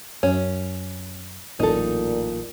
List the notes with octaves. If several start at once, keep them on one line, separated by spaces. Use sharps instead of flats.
F#2 C#4
D1 A1 A#2 D#4 A4